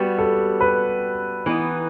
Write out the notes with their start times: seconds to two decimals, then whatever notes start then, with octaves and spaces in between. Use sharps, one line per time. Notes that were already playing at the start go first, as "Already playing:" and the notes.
Already playing: G3 B3 F#4 G4
0.18 A4
0.61 B4
1.46 E3 B3 D#4